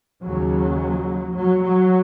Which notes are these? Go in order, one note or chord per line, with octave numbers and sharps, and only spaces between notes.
D#2 C#3 F#3
F#3
F#3